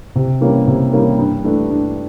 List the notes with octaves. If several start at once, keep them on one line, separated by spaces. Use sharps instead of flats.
C3
E3 G3 A#3 C#4
C3
E3 G3 A#3 C#4
G2
E3 A3 D4
G2